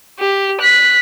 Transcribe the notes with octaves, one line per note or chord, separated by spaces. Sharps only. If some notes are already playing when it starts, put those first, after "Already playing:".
G4
F#6 B6